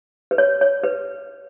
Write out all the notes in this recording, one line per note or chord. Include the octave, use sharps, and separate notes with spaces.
B4
C#5
C#5
B4